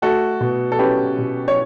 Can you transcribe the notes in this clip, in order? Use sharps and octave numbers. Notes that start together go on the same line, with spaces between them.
A3 F#4 A4
B2
A4
C#4 G4 B4
B2
C#5